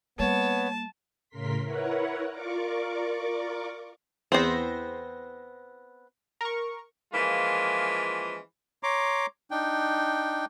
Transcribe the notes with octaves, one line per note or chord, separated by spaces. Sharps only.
G3 A#3 B3 C#5 A5
A2 C#3 A#4 C6 B6
E4 A#4 B4 C#5 F#5
F4 A#4 D5 C#6 D6
E2 B3 C4 C5 A#6
A#4 C#6
E3 F3 G#3 A#3 C#4 F4
C#5 A#5 C6 D6
D4 D#4 G5